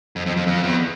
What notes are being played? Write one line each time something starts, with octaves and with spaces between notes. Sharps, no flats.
F2
F2
F2
F2
E2